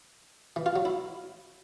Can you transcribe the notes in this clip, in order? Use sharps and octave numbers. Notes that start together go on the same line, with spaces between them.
E3
F4
F#3
E4